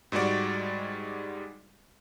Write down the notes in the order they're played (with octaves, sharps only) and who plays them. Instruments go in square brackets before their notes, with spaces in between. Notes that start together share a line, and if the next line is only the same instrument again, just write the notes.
[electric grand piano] G#2 G3 G#3 F#4 D5